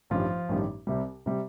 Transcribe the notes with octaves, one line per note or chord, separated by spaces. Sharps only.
A1 G2 D#3 F3 G3 F4
A1 G2 D#3 G3
C2 C3 G3
C3 G3